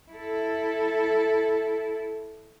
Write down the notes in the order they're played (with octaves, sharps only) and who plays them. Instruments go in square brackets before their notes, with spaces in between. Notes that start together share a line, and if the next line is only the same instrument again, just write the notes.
[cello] E4 A4